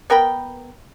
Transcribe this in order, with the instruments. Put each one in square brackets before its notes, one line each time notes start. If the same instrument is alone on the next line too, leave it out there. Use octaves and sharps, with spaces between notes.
[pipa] B3 A#4 G5 B5